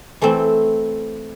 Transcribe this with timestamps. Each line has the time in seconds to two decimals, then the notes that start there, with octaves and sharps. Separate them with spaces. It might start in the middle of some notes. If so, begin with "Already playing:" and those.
0.22 E3 A3 C4 E4